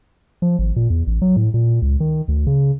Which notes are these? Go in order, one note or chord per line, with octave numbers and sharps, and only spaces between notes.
F3
G#1
A#2
E2
A1
F#3
A2
A#2
C#2
D#3
D2
C#3